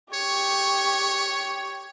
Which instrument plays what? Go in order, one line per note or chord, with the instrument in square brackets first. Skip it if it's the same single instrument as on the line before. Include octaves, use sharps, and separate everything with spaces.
[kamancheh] G4 C#6 [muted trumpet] C#5